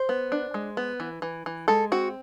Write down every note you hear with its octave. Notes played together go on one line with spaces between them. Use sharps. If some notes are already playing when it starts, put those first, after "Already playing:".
Already playing: C5
B3
D4
G#3
B3
E3
E3
E3
G#3 A4
C4 F#4